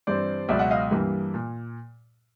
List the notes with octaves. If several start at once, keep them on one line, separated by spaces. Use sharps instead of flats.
G2 E3 G3 C4 C5 D5
C#2 B2 F#3 D5 E5
E5 F#5
D#5 F5
G2 E3 G3 A#3
A#2